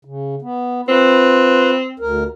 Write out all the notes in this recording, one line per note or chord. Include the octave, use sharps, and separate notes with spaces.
C#3
B3
C4 F4 B4
D2 A#4